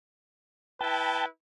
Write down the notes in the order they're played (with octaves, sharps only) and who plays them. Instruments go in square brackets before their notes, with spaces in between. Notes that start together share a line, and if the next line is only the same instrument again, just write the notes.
[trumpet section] E4 B4 [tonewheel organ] G5 A5